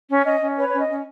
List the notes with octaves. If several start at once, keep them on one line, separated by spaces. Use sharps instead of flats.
C#4
C#4 D#5
C#4
B4 C#5
C#5
C#4
D#5
C#4